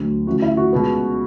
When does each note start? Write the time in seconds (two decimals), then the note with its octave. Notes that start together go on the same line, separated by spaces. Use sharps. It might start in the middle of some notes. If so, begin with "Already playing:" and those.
Already playing: D2 D3 F#3
0.27 D2 C#3 E3 F#4
0.42 E4
0.57 F#4
0.73 C#2 B2 G#3 B3